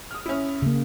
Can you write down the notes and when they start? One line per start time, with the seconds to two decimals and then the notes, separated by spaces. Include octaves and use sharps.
0.11 D#6 F6
0.26 C#4 E4
0.62 C#3 A#3